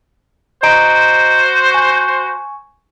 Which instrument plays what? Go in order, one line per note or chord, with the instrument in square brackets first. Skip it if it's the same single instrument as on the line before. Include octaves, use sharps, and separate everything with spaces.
[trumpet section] F#4 C5 [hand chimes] D#5 A#5 D7
[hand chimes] G#5 C#6